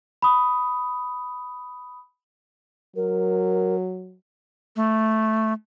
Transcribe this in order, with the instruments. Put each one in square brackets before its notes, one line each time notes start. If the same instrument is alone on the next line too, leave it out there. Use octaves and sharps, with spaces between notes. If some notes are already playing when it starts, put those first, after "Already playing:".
[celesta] B5 D#6
[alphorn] F#3 [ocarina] A#4
[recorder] A3